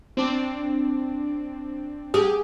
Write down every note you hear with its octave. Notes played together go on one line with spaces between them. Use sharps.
C4 D4
G4 G#4